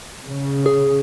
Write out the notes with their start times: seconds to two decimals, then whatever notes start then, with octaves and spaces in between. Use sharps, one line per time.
0.25 C#3
0.66 G#4